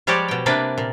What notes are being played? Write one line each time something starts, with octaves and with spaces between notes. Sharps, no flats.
F3 G3 G#3 G4 C#5 D5
B2 G5
C3 A#3 D4 B4 D5
A#2